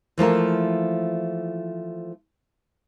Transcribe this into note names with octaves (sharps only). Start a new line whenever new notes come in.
E3 F3 A3 A#3